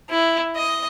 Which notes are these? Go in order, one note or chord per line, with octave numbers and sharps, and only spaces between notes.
E4
D#5